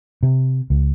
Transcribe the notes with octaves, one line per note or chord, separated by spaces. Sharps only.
C3
C#2